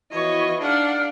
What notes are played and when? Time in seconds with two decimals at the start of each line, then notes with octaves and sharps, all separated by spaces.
0.12 E3 F3 B3 F#4 C#5 D#5
0.62 D4 D#4 G#4 F5 F#5